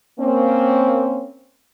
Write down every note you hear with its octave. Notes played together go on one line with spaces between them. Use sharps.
A#3 C4 C#4